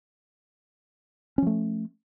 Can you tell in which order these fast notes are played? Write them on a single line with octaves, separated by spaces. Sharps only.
C#4 F3 A3